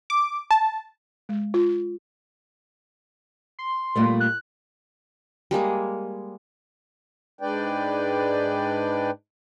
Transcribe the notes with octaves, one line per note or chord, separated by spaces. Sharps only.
D6
A5
G#3
F4
C6
A#2 G3 A3
F#6
G3 G#3 A#3 G#4
G#2 G#3 D4 B4 D5 G5